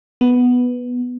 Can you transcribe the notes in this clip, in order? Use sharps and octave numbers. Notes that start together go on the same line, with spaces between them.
B3